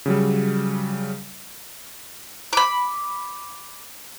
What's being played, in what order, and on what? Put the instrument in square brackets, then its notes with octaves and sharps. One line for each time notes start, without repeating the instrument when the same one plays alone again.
[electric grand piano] C#3 F#3 G3
[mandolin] B5 D6